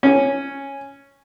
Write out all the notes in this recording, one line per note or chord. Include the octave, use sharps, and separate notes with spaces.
C#4